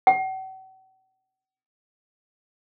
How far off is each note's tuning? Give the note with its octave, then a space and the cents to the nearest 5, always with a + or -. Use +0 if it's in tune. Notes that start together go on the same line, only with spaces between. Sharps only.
F#5 +45